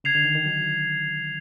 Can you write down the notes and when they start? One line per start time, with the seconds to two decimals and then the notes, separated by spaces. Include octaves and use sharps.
0.04 C#3 G#6 C7 F7
0.15 D3
0.25 D#3
0.35 D#3
0.45 F#3